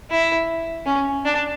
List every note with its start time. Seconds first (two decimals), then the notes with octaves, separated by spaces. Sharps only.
0.10 E4
0.86 C#4
1.25 D4